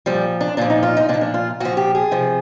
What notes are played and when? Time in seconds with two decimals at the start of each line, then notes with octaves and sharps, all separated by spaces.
0.06 A#2 F3 G3
0.41 D4
0.57 A#2 F3 D4
0.70 D#4
0.83 F4
0.97 D#4
1.09 A#2 D4
1.14 F3
1.21 D4
1.34 F4
1.60 A#2 F3 F#4
1.77 G4
1.95 G#4
2.11 C3 F3